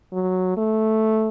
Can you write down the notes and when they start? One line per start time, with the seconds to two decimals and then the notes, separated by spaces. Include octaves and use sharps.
0.13 F#3
0.57 A3